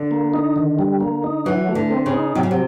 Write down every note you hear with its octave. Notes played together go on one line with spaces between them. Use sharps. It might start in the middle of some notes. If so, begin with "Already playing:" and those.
Already playing: D3
A#3
D#4
D#3
G3
A#3
D#4
E3 F#3
A3
D3
C4
C#3
D#4
C3 F#3
C#3
C3